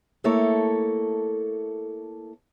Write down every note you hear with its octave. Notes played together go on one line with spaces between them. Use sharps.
A3 A#3 E4 A4 C#5